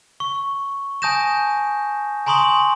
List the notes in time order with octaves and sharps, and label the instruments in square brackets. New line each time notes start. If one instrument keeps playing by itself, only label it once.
[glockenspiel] C#6
G#5 A5 D#6 G6 A#6 E7
G#5 A#5 C6 C#6 D#6 F#7